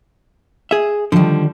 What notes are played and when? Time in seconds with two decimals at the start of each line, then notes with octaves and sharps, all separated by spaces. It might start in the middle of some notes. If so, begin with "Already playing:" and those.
0.71 G#4 E5
1.12 D3 D#3 F3 G3